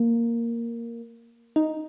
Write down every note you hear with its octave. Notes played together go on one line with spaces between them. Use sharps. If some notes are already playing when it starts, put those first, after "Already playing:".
Already playing: A#3
D#4